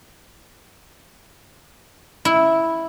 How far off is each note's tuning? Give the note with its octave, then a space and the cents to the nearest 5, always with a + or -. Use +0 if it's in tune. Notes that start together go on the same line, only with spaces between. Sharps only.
E4 -5